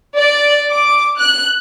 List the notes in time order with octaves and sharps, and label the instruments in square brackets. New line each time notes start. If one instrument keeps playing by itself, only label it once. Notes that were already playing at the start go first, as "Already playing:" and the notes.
[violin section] D5
D6
F#6